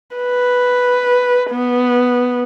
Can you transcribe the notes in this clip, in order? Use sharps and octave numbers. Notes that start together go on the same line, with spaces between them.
B4
B3